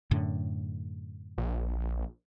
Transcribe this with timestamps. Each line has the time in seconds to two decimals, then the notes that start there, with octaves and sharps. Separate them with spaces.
0.11 F#2 A2 D3
1.38 A#1